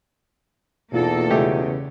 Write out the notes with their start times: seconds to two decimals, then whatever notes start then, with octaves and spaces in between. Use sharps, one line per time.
0.92 E2 B2 A#3 D#4 F4 A4
1.30 C#3 G#3 A3 G4